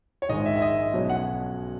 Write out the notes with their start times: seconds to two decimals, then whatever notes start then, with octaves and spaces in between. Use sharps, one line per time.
0.22 C#5
0.29 A#1 G#2 D#3 G#3 D#5
0.46 E5
0.57 E5
0.62 D#5
0.94 B1 B2 F#3 C#4
1.10 F#5